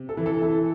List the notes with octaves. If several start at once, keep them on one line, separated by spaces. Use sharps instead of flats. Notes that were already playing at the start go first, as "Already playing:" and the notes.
Already playing: C3
A4
E3
A4
E3 A4